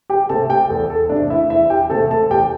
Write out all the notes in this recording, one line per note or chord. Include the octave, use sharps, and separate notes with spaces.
G4 G5
C3 A3 A4 A5
G4 G5
E2 A4
A4
C3 A3 D4 D5
E4 E5
E2 E4 E5
G4 G5
C3 A4 A5
A3
A4 A5
E2 G4 G5